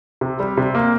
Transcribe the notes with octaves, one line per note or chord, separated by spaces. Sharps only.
C3
G3
C3
A#3